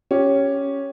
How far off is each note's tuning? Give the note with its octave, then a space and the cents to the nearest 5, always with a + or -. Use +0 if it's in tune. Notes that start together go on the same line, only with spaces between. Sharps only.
C#4 +0 G4 +0